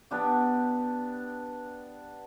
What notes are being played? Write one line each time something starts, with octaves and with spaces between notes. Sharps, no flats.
B3 D4 G4